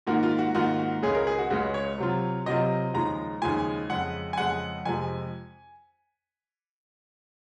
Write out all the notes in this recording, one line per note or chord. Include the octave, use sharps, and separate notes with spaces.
G#2 D#3 A#3 F4 F#4
F4
F#4
G#2 D#3 A#3 F4 F#4
F#4
C#2 C#3 G#3 C#4 G#4
A#4
G#4
F#4
C#2 C#3 G#3 C#4 F#4
C#5
C3 F#3 C4 F4
C3 F#3 C4 F4 D#5
D#2 C#3 F3 G#3 A#5
D#2 C#3 F3 G#3 G#5
F2 C#3 G#3 F#5
G#5
F2 C#3 G#3 F#5
F2 C3 F3 G#3 G#5